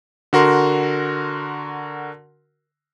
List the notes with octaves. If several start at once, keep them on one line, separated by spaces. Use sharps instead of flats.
D3 F#4 A#4 C6